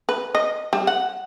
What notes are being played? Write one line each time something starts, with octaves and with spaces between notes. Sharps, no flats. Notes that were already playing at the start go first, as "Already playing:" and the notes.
B4
D#5
G3
F#5